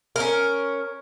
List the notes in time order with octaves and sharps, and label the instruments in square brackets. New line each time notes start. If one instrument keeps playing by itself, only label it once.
[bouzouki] C#4 A#4